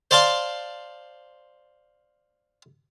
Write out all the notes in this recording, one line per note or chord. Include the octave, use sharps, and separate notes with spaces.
C5 D5 F5 A5 C6